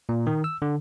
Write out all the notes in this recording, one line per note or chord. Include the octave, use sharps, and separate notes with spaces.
A#2
D#3
E6
D3